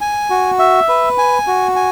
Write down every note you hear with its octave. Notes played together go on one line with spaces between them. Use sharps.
G#5
F#4
E5
B4
G#5
F#4
G#5